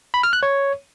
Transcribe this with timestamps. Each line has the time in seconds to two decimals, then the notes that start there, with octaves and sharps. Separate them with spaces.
0.14 B5
0.23 F6
0.33 F#6
0.43 C#5